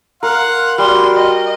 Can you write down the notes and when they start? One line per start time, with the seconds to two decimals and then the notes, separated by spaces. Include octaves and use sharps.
0.23 A#4 F5 F#5 C6
0.78 G3 F#4 C6 F6
1.16 D#5